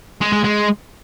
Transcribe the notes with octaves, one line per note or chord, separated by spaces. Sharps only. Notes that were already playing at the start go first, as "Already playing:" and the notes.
G#3
G#3
G#3